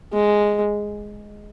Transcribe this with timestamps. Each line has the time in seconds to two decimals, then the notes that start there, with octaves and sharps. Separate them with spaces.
0.13 G#3